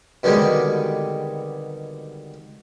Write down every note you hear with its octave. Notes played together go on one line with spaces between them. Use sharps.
B2 D3 D#3 G3 G#3 C4